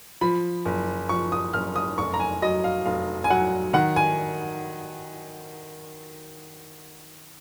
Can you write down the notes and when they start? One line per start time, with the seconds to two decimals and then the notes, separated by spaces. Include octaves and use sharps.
0.21 F3 B5
0.65 F#1
1.09 F3 C#6
1.32 D#6
1.53 F#1 F6
1.76 D#6
1.98 F1 C#6
2.14 A#5
2.20 G#5
2.42 F#3 D#5
2.64 F5
2.86 F1 F5
3.24 G#5
3.30 F#3 F#5
3.73 D#3 F#5
3.96 G#5